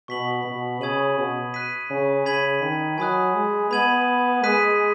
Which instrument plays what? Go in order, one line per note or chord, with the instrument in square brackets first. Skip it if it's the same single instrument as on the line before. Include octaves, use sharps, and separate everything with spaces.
[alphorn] B2 [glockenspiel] C#6 B6 F#7
[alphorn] B2
[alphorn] C#3 [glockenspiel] B5 D#6 G#6 D#7 F#7
[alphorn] B2
[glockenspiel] F#6 B6 D#7
[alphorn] C#3
[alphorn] C#3 [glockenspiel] B5 G#6 B6 D#7 F#7
[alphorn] D#3
[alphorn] F#3 [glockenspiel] G#5 B5 D#6 F#6
[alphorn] G#3
[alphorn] B3 [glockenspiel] B5 G#6 D#7 F#7
[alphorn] G#3 [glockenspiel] D#6 F#6 B6 D#7